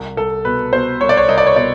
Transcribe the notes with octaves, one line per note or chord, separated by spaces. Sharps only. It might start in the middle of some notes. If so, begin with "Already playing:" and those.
Already playing: C2
C2 A4
B2 B4
B2 C5
C2 C#5
D5
C#5
C2 D#5
D5
C#5
B2 D5